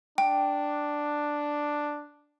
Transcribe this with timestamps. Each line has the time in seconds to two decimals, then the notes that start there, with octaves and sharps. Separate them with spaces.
0.18 D4 G5